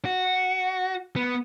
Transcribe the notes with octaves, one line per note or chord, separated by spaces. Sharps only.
F#4
B3